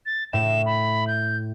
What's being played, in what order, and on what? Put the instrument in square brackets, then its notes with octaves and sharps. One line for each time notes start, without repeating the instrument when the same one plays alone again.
[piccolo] A6
[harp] A2 [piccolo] E7
[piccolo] B5
G6